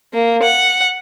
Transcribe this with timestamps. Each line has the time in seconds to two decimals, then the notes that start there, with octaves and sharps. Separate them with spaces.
0.14 A#3
0.43 F#5